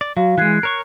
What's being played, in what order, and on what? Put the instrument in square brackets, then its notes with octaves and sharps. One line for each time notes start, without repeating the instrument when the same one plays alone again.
[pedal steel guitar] D5
[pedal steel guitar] F#3 [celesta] F#4 F5
[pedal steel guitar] E3 G#3 [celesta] F#6 G#6 C7
[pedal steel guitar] A#4 C#5 C#6